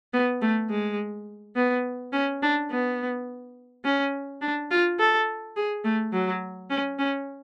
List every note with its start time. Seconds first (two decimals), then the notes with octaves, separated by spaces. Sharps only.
0.13 B3
0.42 A3
0.70 G#3
1.56 B3
2.12 C#4
2.42 D4
2.71 B3
3.84 C#4
4.41 D4
4.71 F4
4.99 A4
5.56 G#4
5.84 A3
6.13 F#3
6.70 C#4
6.99 C#4